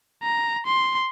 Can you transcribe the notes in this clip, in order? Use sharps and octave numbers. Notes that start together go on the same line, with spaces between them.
A#5
C6